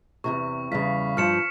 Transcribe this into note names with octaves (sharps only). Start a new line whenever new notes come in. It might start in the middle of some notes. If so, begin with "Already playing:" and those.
E2 A2 C3 C#6
E2 C#3 G3 F5 B6
G2 F3 F6 C#7 E7